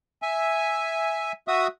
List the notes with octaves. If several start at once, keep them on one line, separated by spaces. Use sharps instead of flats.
E5 G#5
F#4 E5 D#6